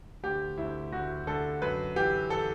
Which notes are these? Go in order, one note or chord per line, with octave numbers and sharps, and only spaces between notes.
D2 G4
D2 E4
D2 F#4
D3 A4
F#2 B4
E3 G4
A4